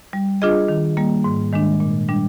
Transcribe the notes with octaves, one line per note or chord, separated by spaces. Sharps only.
G3
D4 F4 G#4 D#5
D#3
G3 A#3
G#2
D#3 G#3 D4
A#2
G3 D4